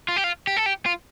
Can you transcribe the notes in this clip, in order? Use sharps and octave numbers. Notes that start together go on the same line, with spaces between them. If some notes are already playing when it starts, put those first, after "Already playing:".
F4
G4
F4
G4
A4
G4
F4